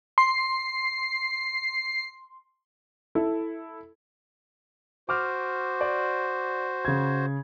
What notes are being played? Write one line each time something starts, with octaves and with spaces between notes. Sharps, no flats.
C6 C7
E4 A4
F#4 C5 D6 F6
D5
C#3 G#6